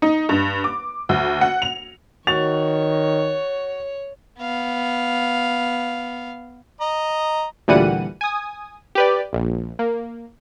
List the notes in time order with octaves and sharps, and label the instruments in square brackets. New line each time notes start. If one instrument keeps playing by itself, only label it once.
[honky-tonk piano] D#4
G2
D6
D2
F#5
F7
[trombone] D#3 [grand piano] F#4 A6 F7 [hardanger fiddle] C#5
[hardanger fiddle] B3 F5
[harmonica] D#5 A#5
[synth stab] D2 A#2 E3 G3 F#5 D#7
G#5 D#6
G4 B4 D5
A#1
A#3